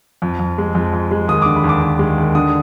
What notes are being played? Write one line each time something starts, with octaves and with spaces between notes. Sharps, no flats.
F2
F2
G#3
F2
F2
G#3
D#2 D#6
D3 D6
B5
D#2
D6
D#2
G#3
D#2
D3 D#6